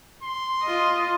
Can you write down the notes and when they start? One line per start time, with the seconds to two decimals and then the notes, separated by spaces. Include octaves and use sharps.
0.23 C6
0.63 F4 D#5